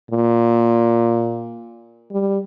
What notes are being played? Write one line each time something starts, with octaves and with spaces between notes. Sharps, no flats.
A#2
G3